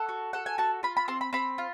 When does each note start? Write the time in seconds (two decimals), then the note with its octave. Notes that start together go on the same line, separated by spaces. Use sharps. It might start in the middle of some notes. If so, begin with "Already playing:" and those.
Already playing: A4 F#5
0.09 F#4
0.33 A4 F#5
0.46 G#5
0.58 F#4 A5
0.83 F4 B5
0.97 B5
1.08 C4 C6
1.21 B5
1.33 C4 B5
1.58 F4